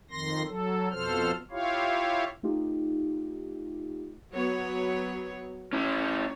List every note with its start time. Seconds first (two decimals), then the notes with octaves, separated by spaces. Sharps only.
0.11 F2 D#3 C6 A#6
0.47 F#3 A4
0.91 F2 B2 F3 A4 C5 F6
1.51 E4 F4 G4 C#5 F5
2.43 A3 D#4 F4 G4
4.33 F#3 B3 C#5
5.73 C#4 E4 C#5